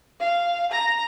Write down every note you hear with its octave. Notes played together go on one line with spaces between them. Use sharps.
F5
A#5